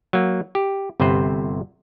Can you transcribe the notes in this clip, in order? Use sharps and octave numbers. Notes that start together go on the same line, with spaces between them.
F#3 A#3
G4
G1 C3 C4 B4 C5